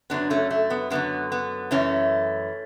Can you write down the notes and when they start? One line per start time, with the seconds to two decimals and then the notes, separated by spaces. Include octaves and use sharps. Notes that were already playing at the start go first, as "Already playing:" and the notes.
0.10 F#2 D3 F#3 B3 D4
0.30 A3 C#4
0.50 A3
0.70 B3
0.90 F#2 D3 F#3 B3
1.32 B3
1.71 F#2 E3 A3 C#4